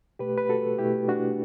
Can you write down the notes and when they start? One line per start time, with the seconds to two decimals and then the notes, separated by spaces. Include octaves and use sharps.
0.19 B2 A3 G4 B4
0.38 B4
0.49 F#4 A4
0.79 B2 A3 E4 G4
1.08 D4 F#4